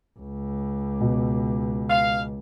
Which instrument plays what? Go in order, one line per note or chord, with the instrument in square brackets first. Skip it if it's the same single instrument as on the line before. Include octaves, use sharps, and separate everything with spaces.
[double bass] C#2
[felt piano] B2
[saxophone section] F5